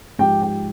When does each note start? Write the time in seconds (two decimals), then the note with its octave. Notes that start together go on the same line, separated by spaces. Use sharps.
0.19 G#2 F3 G4 G5
0.42 G4 G5